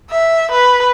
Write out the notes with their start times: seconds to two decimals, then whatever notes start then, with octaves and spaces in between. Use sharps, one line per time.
0.11 E5
0.52 B4